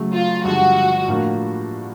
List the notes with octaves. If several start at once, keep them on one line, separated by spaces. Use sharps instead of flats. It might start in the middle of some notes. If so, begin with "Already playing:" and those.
Already playing: C#3 F#3 A3
F4
G2 D3 F3 G#3 F#4
A2 F3 A#3 D4 F#4